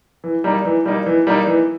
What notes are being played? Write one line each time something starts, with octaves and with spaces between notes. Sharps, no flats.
E3
G3 A#3 D#4
E3
G3 A#3 D#4
E3
G3 A#3 D#4
E3